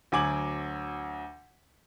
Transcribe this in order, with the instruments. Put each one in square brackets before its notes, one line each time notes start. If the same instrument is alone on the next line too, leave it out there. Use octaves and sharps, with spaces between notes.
[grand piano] D2 F#3 G#5 D6 G#6 F#7